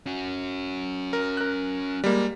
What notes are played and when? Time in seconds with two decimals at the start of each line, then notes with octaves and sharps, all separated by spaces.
0.06 C#4 F#4
1.13 A#4
1.37 A#4 F#6
2.04 G3 G#3 A#3